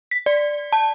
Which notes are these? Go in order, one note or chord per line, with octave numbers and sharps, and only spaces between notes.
B6
D5
A5